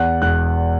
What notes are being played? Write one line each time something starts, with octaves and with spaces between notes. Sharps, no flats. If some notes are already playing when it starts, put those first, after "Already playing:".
Already playing: E2 F#5 F#6
E1 F#5 F#6